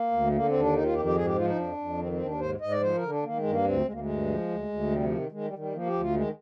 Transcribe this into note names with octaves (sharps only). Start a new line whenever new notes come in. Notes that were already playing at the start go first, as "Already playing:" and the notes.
Already playing: A#3
D2
D3 A#3
C4
D#2
D4
D#3 D#4
F4
F2 G4
G4
G#2 G#4
G4
F3 F4
D#4
F2 D4
F2
D#3 C4
C4
D#2
D4
G#2 C5
G#2 D#5
D5
F3 C5
A#4
D3
D4
D#3 A#3
G#3
G2
A#3
D2 C4
D2 G#3
A#3
G#3
G2
F3
D2
D2
C3 G3
F3
D#3
D#3 G#3
G3
D#3
G3
F3 A#3
G4
D2
F4
D#3 G#3